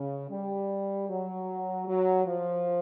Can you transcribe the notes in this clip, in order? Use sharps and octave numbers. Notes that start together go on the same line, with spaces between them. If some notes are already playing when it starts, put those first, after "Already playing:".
Already playing: C#3
G3
F#3
F#3
F3